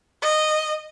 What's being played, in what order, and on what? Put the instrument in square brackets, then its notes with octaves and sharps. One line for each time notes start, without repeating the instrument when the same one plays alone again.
[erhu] D#5